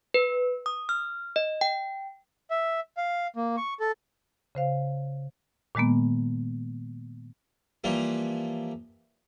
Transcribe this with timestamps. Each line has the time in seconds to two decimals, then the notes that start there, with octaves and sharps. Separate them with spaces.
0.14 B4
0.66 D#6
0.89 F6
1.36 D#5
1.61 G5
2.51 E5
2.97 F5
3.36 A#3
3.57 C#6
3.80 A4
4.55 C#3 C5 F5
5.75 A#2 D#3 G#3 A#3 B3
7.84 E3 F3 G3 A#3